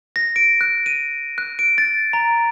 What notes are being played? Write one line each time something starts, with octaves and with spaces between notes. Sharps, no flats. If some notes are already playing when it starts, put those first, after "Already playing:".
A#6
D7
F#6
D#7
F#6
D7
A6
A#5